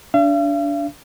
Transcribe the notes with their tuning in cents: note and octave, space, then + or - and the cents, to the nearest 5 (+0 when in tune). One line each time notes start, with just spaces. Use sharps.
D4 -15 F5 -45